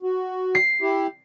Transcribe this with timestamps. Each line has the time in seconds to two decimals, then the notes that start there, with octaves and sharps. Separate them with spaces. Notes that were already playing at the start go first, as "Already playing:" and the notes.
0.03 F#4
0.55 C7
0.81 E4 G4